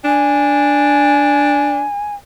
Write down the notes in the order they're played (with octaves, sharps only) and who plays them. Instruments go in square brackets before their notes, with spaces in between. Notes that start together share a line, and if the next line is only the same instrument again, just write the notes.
[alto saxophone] D4 [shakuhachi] G#5